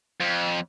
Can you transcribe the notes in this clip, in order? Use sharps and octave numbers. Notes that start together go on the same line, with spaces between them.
F2